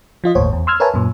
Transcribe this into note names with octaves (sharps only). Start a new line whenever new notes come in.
F3 F4 D#5
G1 D#2 A2 C5 C#5
E2
C6 E6 F6 G#6
A#4 B4 C#5 E5 G#5 A5
F#2 A#2